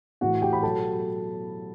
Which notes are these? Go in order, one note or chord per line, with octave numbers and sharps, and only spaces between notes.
A2 E3 F#4 F#5
G4 G5
B5
B2 F#3 A4 A5